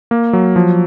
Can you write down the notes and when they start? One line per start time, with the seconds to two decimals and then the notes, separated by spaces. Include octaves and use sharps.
0.11 A#3
0.33 F#3
0.56 F3